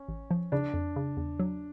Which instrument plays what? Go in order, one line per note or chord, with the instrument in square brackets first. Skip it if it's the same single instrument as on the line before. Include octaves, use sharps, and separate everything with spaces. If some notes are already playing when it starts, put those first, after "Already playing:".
Already playing: [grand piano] C#4
[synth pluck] A1
F3
[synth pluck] C#3 [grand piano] D4
[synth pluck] F2
C#3
E2
F#3